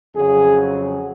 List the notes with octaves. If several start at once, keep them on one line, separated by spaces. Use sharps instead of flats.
F2 C#3 F#3 G#4